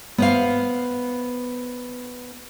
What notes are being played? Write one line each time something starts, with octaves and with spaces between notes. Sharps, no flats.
B3 C5 F5